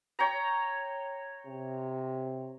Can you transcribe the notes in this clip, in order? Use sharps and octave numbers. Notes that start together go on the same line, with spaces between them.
C#5 G5 A#5
C3